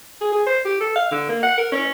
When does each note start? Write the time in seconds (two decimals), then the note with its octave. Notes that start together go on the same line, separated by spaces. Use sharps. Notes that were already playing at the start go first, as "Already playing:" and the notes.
0.21 G#4
0.32 G#4
0.46 C5
0.65 G4
0.80 A4
0.96 F5
1.12 D3
1.29 A#3
1.43 F#5
1.58 A#4
1.72 C#4